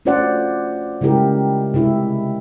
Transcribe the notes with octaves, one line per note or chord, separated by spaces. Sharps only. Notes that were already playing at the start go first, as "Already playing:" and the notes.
A3 C#4 F4 C5 D5 F#5
C#3 G#3 E4 G4 A#4
C3 G#3 E4 G4